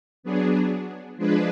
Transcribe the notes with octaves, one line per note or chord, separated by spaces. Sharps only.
F#3 B3 D4 G#4
F3 G#3 D4 G#4 B4